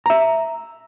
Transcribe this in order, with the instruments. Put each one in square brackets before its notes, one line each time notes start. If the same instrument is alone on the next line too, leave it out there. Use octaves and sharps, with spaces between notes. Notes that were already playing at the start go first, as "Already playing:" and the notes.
[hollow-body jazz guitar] E5 A#5